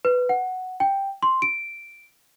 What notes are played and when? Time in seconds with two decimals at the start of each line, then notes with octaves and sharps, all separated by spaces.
0.05 B4
0.29 F#5
0.80 G5
1.23 C6
1.42 D7